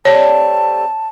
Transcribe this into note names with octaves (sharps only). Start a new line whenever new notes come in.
G3 A3 C4 C#5 A5